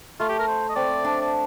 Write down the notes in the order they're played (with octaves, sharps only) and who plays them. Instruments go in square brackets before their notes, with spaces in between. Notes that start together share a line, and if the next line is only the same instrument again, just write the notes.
[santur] A3 [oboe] F4
[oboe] G4
A#4
C5
D#5
[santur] C4 [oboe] D5
[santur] D4
[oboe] D5